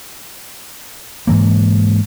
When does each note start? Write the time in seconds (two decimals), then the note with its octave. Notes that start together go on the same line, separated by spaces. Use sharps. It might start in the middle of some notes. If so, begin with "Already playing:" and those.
1.27 G#2 E3 A#3